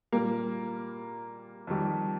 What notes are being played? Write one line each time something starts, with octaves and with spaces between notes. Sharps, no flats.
A#2 G3 A#3
F2 D#3 G3